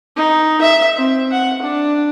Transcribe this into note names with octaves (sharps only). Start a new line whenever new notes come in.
D#4
E5
C4
F#5
D4